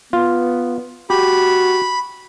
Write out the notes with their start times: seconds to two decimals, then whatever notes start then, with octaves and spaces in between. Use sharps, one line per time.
0.13 B3 F4
1.10 F#4 G4 B5